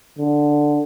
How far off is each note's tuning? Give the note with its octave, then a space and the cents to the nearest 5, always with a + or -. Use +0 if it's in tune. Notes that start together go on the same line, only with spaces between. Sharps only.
D3 +5